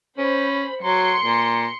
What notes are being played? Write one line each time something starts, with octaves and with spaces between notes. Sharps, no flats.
C#4 C5 B5
F#3 C6 C#7
A#2